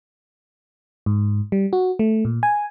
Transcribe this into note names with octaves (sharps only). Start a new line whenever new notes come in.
G#2
G3
F#4
A3
A#2
G#5